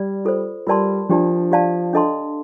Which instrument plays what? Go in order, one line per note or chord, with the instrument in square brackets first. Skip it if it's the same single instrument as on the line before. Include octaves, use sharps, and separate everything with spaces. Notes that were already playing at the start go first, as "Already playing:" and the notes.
Already playing: [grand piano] G3 [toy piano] D5
[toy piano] F4 A4 C5
[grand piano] G3 [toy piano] F4 A#4 D5 A5 C6
[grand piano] F3 [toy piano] D4 G4 D5 A5
[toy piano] G4 D5 F5 A5
D4 A4 D#5 A5 C6